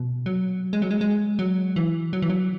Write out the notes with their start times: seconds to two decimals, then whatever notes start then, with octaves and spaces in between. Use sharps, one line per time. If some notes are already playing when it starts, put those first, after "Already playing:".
Already playing: B2
0.26 F#3
0.73 G#3
0.82 F#3
0.91 G#3
1.01 G#3
1.39 F#3
1.76 E3
2.13 F#3
2.22 E3
2.30 F#3